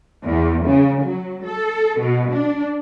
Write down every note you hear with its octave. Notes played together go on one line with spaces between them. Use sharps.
E2
C#3
F#3
A4
B2
D4